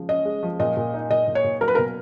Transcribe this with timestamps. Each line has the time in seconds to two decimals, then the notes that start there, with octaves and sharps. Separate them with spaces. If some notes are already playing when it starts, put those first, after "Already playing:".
Already playing: C#3 F3 G#3
0.09 C#4 D#5
0.25 G#3
0.43 F3
0.60 A#2 D#5
0.77 A#2
0.94 D#4
1.10 A#2 D#5
1.28 A#2
1.35 C#5
1.44 A#2
1.61 F#3 A#4
1.68 B4
1.75 A#4
1.78 B2